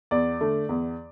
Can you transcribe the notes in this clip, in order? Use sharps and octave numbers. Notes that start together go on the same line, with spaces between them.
E2 D5
D3 A3
E2